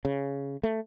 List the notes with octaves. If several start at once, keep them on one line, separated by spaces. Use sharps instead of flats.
C#3
A3